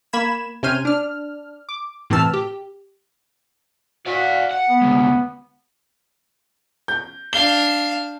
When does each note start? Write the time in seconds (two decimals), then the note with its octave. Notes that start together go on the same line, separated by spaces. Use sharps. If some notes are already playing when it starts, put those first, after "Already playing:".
0.13 A#3 B5 G#6 E7
0.63 C3 C#4 C5 G#5 F6 D#7
0.85 D4 F6
1.69 D6
2.10 A2 C3 E3 A5 E6 F6
2.33 G4
4.07 F#4 D5 F5
4.51 F#5
4.70 B3
4.82 D2 G#3
6.88 G6
7.33 D4 F5 G7